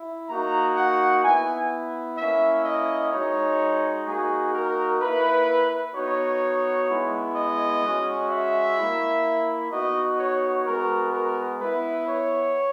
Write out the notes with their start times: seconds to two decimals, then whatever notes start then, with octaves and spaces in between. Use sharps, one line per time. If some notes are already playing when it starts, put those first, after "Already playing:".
Already playing: E4
0.28 A#3 D#4 F#4 A#5
0.76 F#5
1.23 B3 E4 G#5
2.17 A#3 C#4 E4 E5
2.65 D#5
3.12 G#3 D#4 F#4 C#5
4.06 A#3 D#4 F#4 G#4
4.53 A#4
5.00 A#3 E4 B4
5.95 B3 D#4 F#4 C#5
6.89 G#3 B3 E4
7.35 D#5
7.83 G#3 C#4 F#4
8.30 E5
8.78 A#3 E4
9.71 B3 D#4 F#4 D#5
10.19 C#5
10.66 G#3 B3 F#4 A#4
11.13 A#4
11.60 B3 E4 B4
12.07 C#5